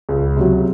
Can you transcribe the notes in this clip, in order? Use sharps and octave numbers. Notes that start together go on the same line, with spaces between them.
C#2
C3 F#3